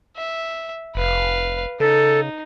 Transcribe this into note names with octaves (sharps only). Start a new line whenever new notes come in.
E5
F1 B4 F5
C#3 D#4 A4